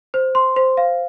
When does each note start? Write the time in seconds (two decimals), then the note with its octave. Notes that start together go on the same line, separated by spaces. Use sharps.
0.14 C5
0.35 C6
0.56 C5
0.77 F5